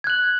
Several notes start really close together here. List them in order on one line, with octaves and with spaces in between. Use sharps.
G#6 F#6 F#7